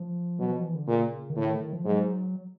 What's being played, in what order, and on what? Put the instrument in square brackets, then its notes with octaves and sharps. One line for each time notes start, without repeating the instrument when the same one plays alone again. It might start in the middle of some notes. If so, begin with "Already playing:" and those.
Already playing: [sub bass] F3
[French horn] B2 [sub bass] F#3
[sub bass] F3
E3
D3
[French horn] A#2 [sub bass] C#3
[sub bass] D#3
[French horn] A2 [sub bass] D3
[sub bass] D#3
D#3
F3
[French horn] G#2 [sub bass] F#3